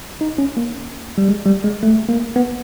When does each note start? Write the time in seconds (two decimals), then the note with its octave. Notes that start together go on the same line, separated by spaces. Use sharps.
0.21 D#4
0.38 C#4
0.57 A#3
1.18 G3
1.29 G#3
1.46 G3
1.64 G#3
1.83 A3
2.09 A#3
2.36 B3